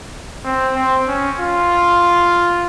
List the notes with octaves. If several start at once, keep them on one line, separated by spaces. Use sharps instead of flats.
C4
C4
C#4
F4